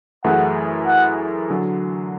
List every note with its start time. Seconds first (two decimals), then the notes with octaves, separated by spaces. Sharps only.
0.24 F#2 E3 A3 E4 G#4 F#5
0.86 F#5
1.50 D3 F#3